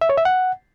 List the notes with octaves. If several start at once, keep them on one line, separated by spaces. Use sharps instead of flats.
E5
C#5
E5
F#5